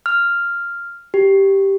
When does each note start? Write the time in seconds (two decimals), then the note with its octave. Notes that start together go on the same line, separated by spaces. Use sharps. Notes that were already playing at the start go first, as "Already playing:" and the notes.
0.06 F6
1.14 G4